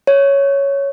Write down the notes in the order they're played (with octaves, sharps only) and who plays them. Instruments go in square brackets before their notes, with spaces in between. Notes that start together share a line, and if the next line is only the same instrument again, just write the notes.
[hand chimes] C#5